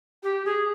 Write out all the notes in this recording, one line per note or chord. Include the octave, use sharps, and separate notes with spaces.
G4
G#4